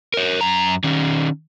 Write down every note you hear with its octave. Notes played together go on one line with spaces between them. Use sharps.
A#4 C#5
F#2 A#5
D#3 C#4